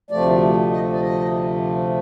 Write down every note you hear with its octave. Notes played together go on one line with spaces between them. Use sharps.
D2 C3 F3 A3 D5
D#5
D5
D#5